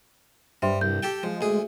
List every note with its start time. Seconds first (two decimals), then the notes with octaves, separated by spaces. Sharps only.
0.62 G2 G3 C5 E5 C6
0.81 C2 G6
1.03 G4 A4 G5
1.23 F3 G#3
1.41 D2 G#4